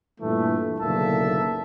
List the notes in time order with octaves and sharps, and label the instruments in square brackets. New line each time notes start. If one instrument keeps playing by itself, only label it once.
[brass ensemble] G2 A#2 E3 A3
F#1 B1 D3 A#3 E5 A5